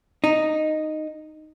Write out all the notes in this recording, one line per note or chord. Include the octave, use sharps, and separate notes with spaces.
D#4